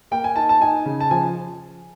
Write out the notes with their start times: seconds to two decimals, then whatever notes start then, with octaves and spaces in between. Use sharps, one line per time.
0.11 A#3 G5
0.24 G#5
0.36 D#4 A5
0.49 A5
0.61 D#4 G#5
0.86 C#3
1.00 A5
1.11 F3 G#5